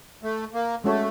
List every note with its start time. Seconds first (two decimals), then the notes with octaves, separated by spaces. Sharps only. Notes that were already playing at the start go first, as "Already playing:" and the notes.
0.23 A3
0.54 A#3
0.84 G#3 A3 C#4 F#4 A4 C#5